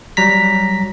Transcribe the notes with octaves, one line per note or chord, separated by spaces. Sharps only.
F#3 G3 A#5 B6